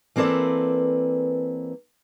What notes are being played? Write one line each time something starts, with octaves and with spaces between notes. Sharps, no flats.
E3 A#3 C4 A4 B4 D5